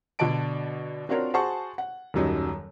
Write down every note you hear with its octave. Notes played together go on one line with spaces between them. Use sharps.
B2 D3 D4 D5 A5 D7
C4 D4 F4 F#4 A#4 C#5
F#4 G#4 C5 F#5 A5 C#6
F#5
D#1 G#1 F#2 F#3 G3 D#4